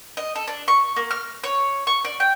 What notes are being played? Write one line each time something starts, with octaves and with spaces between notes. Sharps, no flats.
D#5
A4
D4
C#6
A#3
F6
C#5
C#6
D5
G5